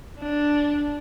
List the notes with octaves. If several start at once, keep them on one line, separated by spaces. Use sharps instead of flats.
D4